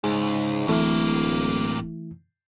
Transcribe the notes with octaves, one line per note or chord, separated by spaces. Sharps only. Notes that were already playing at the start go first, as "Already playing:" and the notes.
C#2 G#2 G#4
D1 A2 E3 A3 A#3 E4